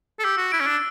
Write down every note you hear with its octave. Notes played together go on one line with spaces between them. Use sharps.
A4
G4 E6
F#4
E4 D7
C#4
D4